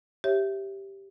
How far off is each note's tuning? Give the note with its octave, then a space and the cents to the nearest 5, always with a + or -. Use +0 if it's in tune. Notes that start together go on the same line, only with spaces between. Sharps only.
G4 +0 C#5 -20 E5 +5